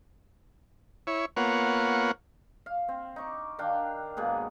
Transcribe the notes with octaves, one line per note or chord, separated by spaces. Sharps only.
E4 C#5
A#3 B3 F4 C#5 F#5
F5
C4
D#4 C#6 D6
D#3 D4 F5 G5
G#2 B2 A#3 G#4